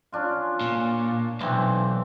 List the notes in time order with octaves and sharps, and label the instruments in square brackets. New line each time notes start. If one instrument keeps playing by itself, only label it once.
[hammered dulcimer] C#4 D4 F4
[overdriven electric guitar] A#2
[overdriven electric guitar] B1 [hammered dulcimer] E3 C4